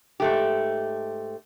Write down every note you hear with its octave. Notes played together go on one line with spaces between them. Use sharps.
G#2 A3 G4